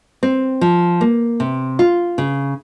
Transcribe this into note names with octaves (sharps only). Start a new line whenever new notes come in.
C4
F3
A#3
C3
F4
C#3